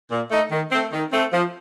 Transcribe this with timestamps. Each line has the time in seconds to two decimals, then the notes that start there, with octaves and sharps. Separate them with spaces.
0.11 A#2
0.31 A3 D#4
0.52 D#3
0.72 A3 C4
0.93 D#3
1.12 A3 C4
1.33 F3